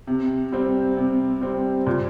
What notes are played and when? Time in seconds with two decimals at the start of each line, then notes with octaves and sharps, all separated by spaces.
0.07 C3
0.52 G3 C4
0.97 C3
1.41 G3 C4
1.87 A#2